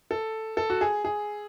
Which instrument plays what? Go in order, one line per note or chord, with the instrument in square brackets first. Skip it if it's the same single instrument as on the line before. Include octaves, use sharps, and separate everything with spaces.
[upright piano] A4
A4
F#4
G#4
G#4